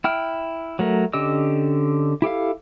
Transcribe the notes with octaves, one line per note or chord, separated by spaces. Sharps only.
E4 G5 F6
F#3 A3 A#4
D3 C#4 G4 D#5 E6
E4 G4 A4 F5